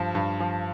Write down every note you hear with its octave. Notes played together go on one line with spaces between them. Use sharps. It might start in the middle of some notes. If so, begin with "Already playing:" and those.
Already playing: G2 F3
G2
F3